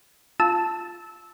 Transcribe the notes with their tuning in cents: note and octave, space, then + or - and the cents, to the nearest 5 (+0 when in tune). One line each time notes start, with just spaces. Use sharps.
F4 +0 A5 +0 E6 -15